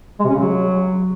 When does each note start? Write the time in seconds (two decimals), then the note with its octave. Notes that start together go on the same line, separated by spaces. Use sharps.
0.19 G#3
0.24 C3
0.29 C#4
0.34 C#3
0.39 F#3